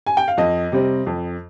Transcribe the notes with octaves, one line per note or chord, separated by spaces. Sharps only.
G#5
G5
F5
F2 D#5
C3 G3 C4
F2